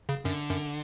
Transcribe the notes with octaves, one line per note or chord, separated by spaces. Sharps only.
C#3
F#2 D3
F#2